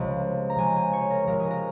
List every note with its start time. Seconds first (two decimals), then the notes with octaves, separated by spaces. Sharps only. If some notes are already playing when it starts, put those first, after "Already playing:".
Already playing: C#2 C3 F3
0.50 A#5
0.58 C#2 C3 F3 G#5
0.76 G#5
0.93 C#5
1.11 A#4
1.27 C#2 C3 F3 A#4
1.40 G#4
1.51 A#4